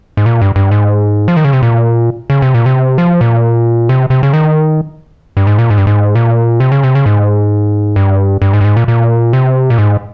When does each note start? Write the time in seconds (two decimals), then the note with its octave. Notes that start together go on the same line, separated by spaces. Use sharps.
0.17 G#2
0.26 A#2
0.41 G2
0.56 G2
0.71 G#2
1.28 F3
1.36 D#3
1.45 C#3
1.53 C3
1.63 A#2
2.30 C#3
2.42 C3
2.54 A#2
2.66 C3
2.98 F3
3.21 A#2
3.89 C3
4.10 C3
4.23 C#3
4.33 D#3
5.37 G2
5.47 G#2
5.59 A#2
5.70 G#2
5.78 G2
5.87 G#2
6.15 A#2
6.60 C3
6.72 C#3
6.84 C3
6.95 C#3
7.06 G#2
7.96 G2
8.42 G2
8.53 G#2
8.61 G2
8.64 G#2
8.77 A#2
8.88 A#2
9.33 C3
9.70 A#2
9.78 G#2